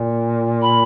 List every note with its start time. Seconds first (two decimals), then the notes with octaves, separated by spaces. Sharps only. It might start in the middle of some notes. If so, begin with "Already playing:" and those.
Already playing: A#2
0.61 B5